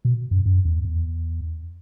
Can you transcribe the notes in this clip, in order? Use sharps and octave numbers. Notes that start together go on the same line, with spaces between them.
B2
F#2
F#2
E2
E2